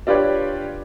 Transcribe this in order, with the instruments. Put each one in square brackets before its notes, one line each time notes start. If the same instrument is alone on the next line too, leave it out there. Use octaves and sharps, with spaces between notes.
[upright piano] D4 F4 G4 B4 C#5 D5